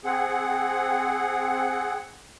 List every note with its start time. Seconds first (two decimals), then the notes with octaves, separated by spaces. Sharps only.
0.04 C4 G#4 F#5